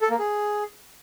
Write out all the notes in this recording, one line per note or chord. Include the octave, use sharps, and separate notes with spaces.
A4
A#3
G#4